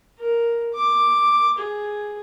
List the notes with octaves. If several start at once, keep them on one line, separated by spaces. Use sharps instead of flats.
A#4
D6
G#4